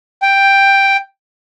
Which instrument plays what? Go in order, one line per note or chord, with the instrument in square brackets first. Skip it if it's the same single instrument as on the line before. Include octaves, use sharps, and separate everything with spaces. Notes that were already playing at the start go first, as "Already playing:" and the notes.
[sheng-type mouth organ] G5